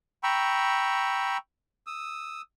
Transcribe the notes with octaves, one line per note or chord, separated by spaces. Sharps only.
G5 A#5 B5 C#6 E6
D#6 E6